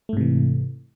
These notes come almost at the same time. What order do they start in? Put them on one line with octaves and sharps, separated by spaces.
A3 G#2 C3 E3